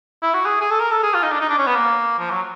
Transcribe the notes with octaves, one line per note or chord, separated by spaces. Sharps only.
E4
F#4
G#4
G#4
A4
A#4
A4
G#4
F4
D#4
D4
D#4
D4
C#4
B3
A#3
F3
F#3